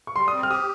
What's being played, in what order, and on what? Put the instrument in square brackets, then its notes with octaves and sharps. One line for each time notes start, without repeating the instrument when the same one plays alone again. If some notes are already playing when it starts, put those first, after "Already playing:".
[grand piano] C#6
[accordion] G3 [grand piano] C6
[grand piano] D#6
[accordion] C4
[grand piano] F6
[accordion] G4 [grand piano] D#6